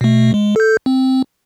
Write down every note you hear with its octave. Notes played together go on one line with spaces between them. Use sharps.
B2 A3
G#3
A4 G6
C4